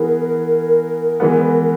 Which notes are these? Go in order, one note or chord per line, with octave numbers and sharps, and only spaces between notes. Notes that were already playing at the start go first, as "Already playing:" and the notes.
Already playing: E3 B3 E4 G#4 A#4
E3 G#3 B3